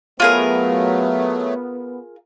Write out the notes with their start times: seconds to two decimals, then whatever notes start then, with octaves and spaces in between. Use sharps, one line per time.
0.20 F#3 A3 B3 F4 G#4 A#4